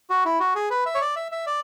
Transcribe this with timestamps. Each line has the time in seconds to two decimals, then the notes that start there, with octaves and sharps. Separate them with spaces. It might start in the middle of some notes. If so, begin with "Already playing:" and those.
0.10 F#4
0.25 E4
0.40 F#4
0.55 G#4
0.70 B4
0.86 E5
0.95 C#5
1.01 D5
1.16 E5
1.32 E5
1.47 D5